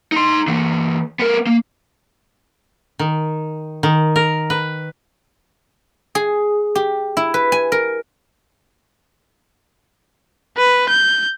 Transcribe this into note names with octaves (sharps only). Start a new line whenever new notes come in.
D#4 C6
E3 A#3
B3 A#4
A#3
D#3
D#3
A#4
B4
G#4
G4
E4
B4
G#5
A#4
B4
G6